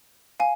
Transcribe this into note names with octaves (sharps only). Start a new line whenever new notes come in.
F5 G#5